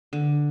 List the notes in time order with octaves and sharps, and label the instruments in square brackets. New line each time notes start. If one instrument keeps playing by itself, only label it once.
[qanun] D3